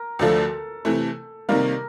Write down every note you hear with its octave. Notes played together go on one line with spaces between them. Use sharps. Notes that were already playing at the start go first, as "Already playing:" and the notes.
Already playing: A#4
D2 D3 F3 A3 A4
C3 E3 A3
C3 D#3 G3 A#3 A#4